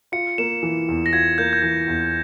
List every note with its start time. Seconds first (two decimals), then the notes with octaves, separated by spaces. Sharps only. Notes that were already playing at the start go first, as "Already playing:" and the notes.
0.12 F4 C#7
0.38 A#3 E7
0.63 E3
0.88 E2
1.06 A#6
1.13 F4 G#6
1.38 A#3 G6
1.53 G6
1.62 E3 G#6
1.88 E2